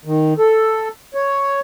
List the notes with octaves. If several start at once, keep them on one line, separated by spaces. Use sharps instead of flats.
D#3
A4
C#5